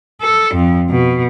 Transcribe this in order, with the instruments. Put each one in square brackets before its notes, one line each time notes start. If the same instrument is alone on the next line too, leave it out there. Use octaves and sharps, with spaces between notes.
[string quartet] A4
F2
B2